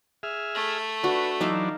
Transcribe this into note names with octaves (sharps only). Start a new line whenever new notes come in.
G#4 E5 F6
A3
D4 F#4 B4
E3 F#3 D4 D#4 E5 F5